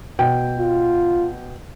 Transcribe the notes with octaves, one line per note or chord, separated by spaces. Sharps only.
B2 G5
F4